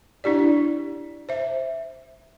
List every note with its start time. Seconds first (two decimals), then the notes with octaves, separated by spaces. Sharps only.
0.24 D4 E4 G4 D5
1.29 C5 E5